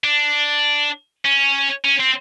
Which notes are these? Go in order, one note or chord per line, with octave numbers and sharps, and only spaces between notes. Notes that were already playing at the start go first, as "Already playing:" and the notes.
D4
C#4
C#4
C4